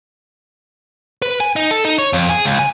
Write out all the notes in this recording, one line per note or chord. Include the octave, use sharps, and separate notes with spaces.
B4
G#5
D#4
A4
D#4
C#5
F2
G#4
C#2
G#5